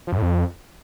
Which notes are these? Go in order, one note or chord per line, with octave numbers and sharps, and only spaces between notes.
F3
F#2
A2
F2